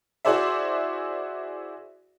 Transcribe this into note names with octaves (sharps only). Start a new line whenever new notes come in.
E4 F#4 G#4 C5 D5 E5